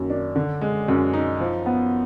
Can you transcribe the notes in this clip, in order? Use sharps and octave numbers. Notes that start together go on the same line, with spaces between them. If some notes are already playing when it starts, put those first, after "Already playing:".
Already playing: F#2 D#3 A#3
D4
D3
G#3
F#2
D#4
F3
B3